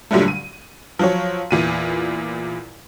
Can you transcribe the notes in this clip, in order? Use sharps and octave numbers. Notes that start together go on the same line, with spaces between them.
G2 A#2 D3 F#3 G3 A3
D#7
F3 F#3 C#5
E2 A#2 D#7